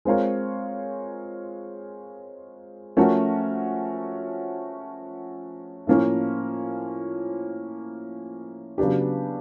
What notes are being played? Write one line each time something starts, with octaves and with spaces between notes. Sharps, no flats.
G#3 C4 F4 A#4 C#5
F3 A3 C#4 F#4 A#4
A2 F3 A#3 C#4 F4
C#3 F#3 B3 D4 G4